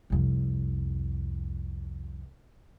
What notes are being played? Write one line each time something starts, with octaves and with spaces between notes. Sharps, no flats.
C2 F2